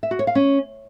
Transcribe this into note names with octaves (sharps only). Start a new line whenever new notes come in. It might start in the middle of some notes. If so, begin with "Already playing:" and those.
E5
F#4
C#5
F5
C#4